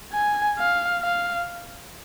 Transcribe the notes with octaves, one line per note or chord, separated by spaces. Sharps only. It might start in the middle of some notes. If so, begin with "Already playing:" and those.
G#5
F5
F5